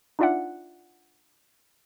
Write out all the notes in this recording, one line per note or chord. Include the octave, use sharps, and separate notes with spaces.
D4 D#4 F4 D5 E5 F#5